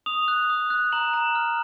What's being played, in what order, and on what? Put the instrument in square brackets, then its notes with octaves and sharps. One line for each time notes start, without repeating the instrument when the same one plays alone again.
[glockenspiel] D#6 F7
F#6
D#6
F#6
A#5 F#7
A#5
F6